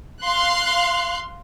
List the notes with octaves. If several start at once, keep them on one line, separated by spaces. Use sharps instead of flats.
F5 C6 F#6